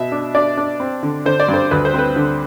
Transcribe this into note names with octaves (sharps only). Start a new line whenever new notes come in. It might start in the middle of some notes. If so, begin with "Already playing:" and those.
Already playing: B2 E5
D4
D4 D5
D4
C4
D3
D3 C5
D5
G2
C5
D2 B4
C5
C4 B4
D3